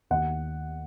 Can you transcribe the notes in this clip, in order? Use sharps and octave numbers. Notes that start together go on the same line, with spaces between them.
D#2 F#5